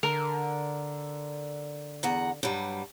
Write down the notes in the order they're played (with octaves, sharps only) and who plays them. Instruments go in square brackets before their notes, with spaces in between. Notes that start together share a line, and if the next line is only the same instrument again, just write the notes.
[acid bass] D3 [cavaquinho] A#4
[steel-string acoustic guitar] E2 F#5 A#5
G2 F#3 G3